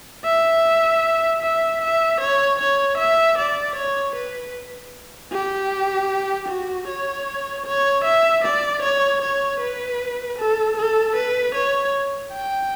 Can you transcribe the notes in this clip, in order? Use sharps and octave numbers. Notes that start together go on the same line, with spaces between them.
E5
E5
E5
C#5
C#5
E5
D5
C#5
B4
G4
F#4
C#5
C#5
E5
D5
C#5
C#5
B4
A4
A4
B4
C#5
G5